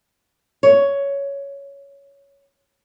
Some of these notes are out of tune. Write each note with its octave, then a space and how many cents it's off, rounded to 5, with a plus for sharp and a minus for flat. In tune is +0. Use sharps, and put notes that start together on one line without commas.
C#5 +10